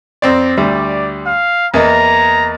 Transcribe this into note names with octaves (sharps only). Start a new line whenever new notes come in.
F2 C4 D5
D2 G3 D5
F5
E2 A#3 D#5 A#5